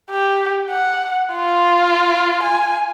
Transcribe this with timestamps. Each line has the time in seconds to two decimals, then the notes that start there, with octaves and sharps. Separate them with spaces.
0.11 G4
0.71 F#5
1.33 F4
2.43 G#5